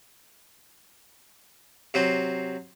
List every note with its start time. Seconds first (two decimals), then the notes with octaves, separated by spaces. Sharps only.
1.94 C3 F#3 C5